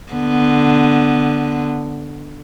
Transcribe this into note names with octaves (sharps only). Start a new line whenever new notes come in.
D3 B3